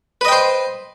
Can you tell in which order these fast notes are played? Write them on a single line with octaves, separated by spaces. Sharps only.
B4 D#5 G5 C5